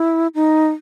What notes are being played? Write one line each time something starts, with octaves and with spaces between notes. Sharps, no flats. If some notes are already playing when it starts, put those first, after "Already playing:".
Already playing: E4
D#4